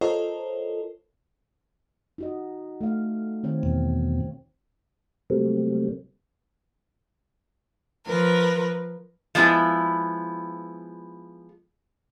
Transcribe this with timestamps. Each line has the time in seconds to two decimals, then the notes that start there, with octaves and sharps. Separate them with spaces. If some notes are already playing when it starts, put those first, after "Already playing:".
0.01 F4 A4 A#4 C5 C#5 D#5
2.18 D#4 F#4 D#5
2.81 A3 F5
3.43 D#3 C4 C#5
3.63 E2 B2
5.30 C3 F#3 G3 A3 A#3 C4
8.06 F3 A#4 B4
9.35 F3 G#3 B3 E4